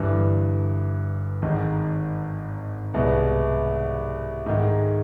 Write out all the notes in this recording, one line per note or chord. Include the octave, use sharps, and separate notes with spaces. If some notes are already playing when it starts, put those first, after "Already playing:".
Already playing: G1 G2 E3
G#1 G#2 D#3
C2 B2 G#3 B3
G#2 D#3 G#3